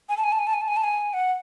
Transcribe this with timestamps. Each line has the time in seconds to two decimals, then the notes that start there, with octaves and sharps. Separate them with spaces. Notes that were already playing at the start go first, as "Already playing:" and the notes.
0.09 G#5
0.17 A5
0.24 G#5
0.32 A5
0.39 G#5
0.47 A5
0.54 G#5
0.61 A5
0.68 G#5
0.77 A5
0.84 G#5
1.13 F#5